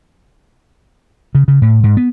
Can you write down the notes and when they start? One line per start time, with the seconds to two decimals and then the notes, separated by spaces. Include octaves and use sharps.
1.35 C#3
1.48 C#3
1.62 A2
1.84 G#2
1.97 B3